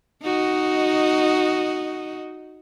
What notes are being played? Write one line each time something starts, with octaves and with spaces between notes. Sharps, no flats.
D#4 F#4 D#5